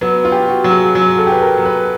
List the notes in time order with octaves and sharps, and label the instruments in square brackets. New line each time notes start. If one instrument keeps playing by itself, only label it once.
[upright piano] F#3 [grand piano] B3
[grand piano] F4
[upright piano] G4
[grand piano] F#4
[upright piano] F#3
[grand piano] G#4
[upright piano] F#3 [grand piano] G#4
[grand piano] A4
[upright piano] G4
[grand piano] B4
A#4
[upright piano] F#3
[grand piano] B4